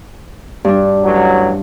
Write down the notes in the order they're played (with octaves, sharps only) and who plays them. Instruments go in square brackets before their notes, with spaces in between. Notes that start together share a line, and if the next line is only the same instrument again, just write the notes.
[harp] G2 D4
[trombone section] A1 F#3